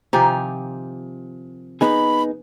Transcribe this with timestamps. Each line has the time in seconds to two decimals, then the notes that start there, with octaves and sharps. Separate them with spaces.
0.13 C3 D#3 F3 G4 G#5 A#5
1.81 B3 D#4 G#4 B5